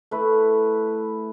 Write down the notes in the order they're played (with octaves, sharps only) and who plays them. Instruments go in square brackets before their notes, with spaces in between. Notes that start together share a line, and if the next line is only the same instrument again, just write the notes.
[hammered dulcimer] A3 E4 B4